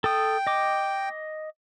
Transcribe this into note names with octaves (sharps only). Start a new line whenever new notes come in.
A4 G5 D#6
D#5 D6